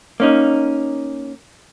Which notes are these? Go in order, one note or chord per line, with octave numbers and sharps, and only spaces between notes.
A#3 C#4 D#4